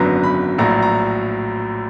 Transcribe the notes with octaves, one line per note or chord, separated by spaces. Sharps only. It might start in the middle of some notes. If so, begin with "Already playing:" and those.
Already playing: G#1 F#2 D3 F#3 B3 A#5
B5
A#1 A2 F#3 A#5
A#5
A#5